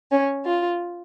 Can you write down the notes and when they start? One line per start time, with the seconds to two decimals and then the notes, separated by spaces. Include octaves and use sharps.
0.11 C#4
0.44 F4